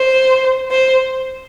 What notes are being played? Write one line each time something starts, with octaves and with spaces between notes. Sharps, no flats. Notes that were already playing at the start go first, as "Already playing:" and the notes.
Already playing: C5
C5